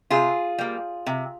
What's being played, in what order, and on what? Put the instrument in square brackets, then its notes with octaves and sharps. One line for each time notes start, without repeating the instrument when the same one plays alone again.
[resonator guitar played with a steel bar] C3 F4 G#4
G3 A#3
C3